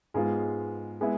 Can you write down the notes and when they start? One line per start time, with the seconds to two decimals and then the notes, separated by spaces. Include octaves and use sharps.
0.14 G#2 G#3 B3 F4
1.01 G#3 B3 E4